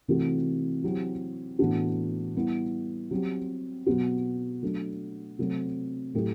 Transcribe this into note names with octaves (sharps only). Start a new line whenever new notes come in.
C3 E3 A3 C4 F#4
F#3 C4 E4 G4
A2 E3 B3 D4 F#4
G3 B3 E4
F#3 C4 G4
B2 F#3 B3 F#4
F#3 A3 D4
C3 F#3 A3 C4
A2 F#3 A3 E4 G4